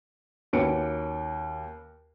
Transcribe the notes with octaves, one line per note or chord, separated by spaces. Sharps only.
D#2 C#4 F#4 B4 C#7 D7